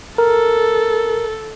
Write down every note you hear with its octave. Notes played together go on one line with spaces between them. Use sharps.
A4 A#4